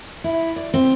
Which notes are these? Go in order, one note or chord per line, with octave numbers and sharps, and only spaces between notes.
E4
D5
C4